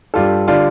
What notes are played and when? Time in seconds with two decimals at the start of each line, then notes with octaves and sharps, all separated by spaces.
0.14 G2 G3 F4 A4
0.48 D3 G3 F4 D5